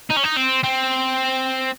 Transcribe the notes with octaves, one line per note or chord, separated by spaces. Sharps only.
D#4
C#4
D#4
C4
C4